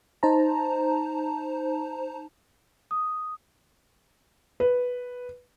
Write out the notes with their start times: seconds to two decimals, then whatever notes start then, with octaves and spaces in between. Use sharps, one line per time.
0.23 D#4 C5 A5 A#5
2.91 D#6
4.60 B4